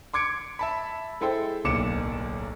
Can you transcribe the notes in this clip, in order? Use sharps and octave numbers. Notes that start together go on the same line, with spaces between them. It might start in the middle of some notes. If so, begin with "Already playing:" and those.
C6 D6 G#6 C#7 D7
E5 A5 B5
G#3 E4 A4 C5 G5
D1 B1 A#3 D6 C#7 E7